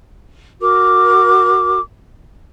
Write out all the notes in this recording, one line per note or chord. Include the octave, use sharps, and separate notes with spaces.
F#4 A#4 D6